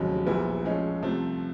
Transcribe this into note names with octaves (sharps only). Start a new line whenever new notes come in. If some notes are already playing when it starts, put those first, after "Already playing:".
Already playing: F1 D#2 C#3 F#3
A#1 A#2 G3 B3 E4
A2 F3 G#3 C#4
C2 C3 F3 A3 C4